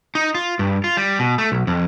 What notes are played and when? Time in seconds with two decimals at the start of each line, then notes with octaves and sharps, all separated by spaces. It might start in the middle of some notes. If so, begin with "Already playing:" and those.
0.15 D#4
0.35 F4
0.59 G2
0.84 F4
0.97 G3
1.19 B2
1.38 A3
1.52 B1
1.67 F2